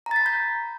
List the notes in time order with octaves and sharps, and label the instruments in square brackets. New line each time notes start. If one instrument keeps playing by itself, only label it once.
[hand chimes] A#5
A6
B6
B5
G6